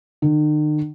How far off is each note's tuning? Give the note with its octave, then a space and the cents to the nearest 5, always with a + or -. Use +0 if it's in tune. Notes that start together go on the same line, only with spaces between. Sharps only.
D#3 -45